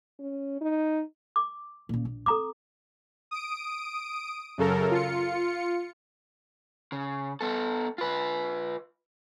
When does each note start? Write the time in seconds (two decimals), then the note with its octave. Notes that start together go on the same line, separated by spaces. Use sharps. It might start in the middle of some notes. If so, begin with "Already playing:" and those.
0.19 C#4
0.61 D#4
1.36 D6
1.89 A#2 C#3
2.05 A#1
2.26 C4 A4 A#5 D6
3.31 D#6 D7
4.58 F#2 C#3 A4 A#4
4.91 F4 C#7
6.92 C#3
7.41 B3 A4
7.98 F4 B4